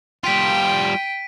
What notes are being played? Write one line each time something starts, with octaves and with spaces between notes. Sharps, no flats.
G3 F4 G5 B6 D7 D#7